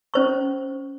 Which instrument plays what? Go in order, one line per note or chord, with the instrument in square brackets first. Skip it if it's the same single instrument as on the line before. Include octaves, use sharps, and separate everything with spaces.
[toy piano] C#4 C5 C#6